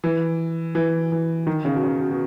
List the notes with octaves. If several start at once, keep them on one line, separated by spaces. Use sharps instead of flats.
E3
E3
E3
D#3
C#3
B2
C#3
B2
B2